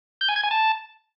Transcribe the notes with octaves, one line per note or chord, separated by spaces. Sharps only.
G6
G#5
G#6
G#5
A5